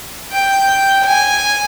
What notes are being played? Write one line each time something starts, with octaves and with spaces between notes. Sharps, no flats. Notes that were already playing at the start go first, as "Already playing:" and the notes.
G5
G#5